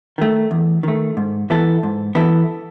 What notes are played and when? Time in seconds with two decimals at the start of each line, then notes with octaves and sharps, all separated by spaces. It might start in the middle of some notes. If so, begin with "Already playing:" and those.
0.18 D#3 A3
0.51 E2
0.83 D#3 A3
1.17 G#2
1.50 E3 B3 E4 A4
1.83 G#2
2.15 E3 B3 E4 A4